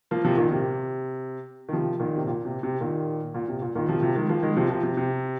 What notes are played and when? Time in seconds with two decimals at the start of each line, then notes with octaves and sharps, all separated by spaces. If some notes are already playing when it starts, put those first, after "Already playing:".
0.11 F3 A#3
0.25 C3 F3
0.38 A#2 D#3
0.51 C3
1.69 D#3
1.73 C3 F3
2.00 A#2 D#3
2.17 C3
2.27 A#2
2.45 C3
2.63 C3
2.81 A#2 D#3
3.34 A#2
3.48 C3
3.62 A#2
3.75 A#2 D#3
3.88 C3 F3
4.02 C3 F3
4.16 D#3 G#3
4.29 F3 A#3
4.43 D#3 G#3
4.56 C3 F3
4.70 C3 F3
4.83 C3
4.97 C3